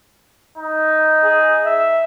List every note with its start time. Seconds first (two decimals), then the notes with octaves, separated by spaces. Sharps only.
0.58 D#4
1.24 G#4
1.65 E5